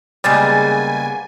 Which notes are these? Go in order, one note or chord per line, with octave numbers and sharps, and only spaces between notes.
C#3 G3 G#3 A#3 B3 G#5 A6